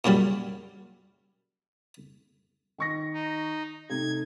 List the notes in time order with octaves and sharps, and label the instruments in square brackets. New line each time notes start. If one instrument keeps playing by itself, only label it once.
[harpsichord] A#2 C#3 F#3 G3
[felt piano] D#3 C#6 A#6
[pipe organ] D#4
[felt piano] C3 A3 D#4 [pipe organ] G#6